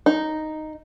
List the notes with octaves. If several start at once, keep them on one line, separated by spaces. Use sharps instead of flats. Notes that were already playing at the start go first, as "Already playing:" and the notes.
D#4